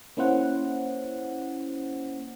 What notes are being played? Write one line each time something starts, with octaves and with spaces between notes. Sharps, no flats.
A#3 C#4 E4 C5 F#5